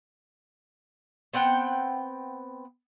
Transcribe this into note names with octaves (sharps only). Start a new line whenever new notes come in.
B3 C4 F#5 G5